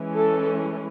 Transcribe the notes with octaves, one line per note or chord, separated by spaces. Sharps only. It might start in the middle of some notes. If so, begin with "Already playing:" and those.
Already playing: E3 G#3 C#4
A4